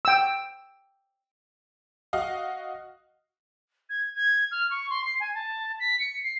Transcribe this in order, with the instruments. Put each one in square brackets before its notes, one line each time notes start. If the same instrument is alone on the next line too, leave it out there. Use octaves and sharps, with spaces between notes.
[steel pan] G5 E6
[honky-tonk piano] F#4 D#5 F5
[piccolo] G#6
G#6
F6
C#6
C6
C7
G#5
A5
B6
C#7
C7